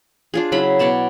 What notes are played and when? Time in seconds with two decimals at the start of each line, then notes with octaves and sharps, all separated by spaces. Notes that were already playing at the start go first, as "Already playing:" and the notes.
0.34 D4 F4 G#4
0.52 C#3 F#3 E4 B5
0.79 B2 C#5 D5 A5